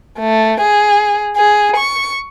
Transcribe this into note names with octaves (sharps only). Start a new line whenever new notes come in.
A3
G#4
G#4
C#6